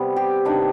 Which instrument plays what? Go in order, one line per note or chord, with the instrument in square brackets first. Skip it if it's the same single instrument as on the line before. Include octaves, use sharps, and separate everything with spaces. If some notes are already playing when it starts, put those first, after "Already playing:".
Already playing: [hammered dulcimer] C3 G3 B3
G4
C3 D#3 B3 D4